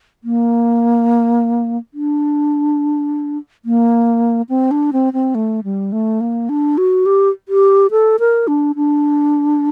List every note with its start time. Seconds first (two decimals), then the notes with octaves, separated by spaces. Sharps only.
0.24 A#3
1.94 D4
3.65 A#3
4.49 C4
4.71 D4
4.93 C4
5.13 C4
5.35 A3
5.64 G3
5.92 A3
6.21 A#3
6.49 D4
6.78 F#4
7.06 G4
7.49 G4
7.91 A4
8.20 A#4
8.47 D4
8.76 D4